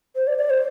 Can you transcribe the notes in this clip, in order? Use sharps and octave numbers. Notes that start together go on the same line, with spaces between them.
C5
D5
D5
C5